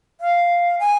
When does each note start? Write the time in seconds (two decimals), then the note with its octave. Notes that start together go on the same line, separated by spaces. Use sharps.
0.21 F5
0.79 G#5